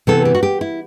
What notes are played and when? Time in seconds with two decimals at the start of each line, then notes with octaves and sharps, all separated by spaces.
0.07 C3 E3 B3 A4
0.25 G4
0.35 F#4
0.43 G4
0.61 E4